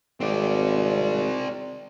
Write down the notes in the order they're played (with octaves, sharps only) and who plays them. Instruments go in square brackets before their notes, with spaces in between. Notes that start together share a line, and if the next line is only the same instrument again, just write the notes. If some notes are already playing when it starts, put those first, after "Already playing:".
[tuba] G#1 [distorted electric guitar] C4 D5